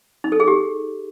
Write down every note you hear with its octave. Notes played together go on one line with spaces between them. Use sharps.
D#4
A4
G#4
G4